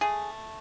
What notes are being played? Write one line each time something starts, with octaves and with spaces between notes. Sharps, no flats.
A3 G#4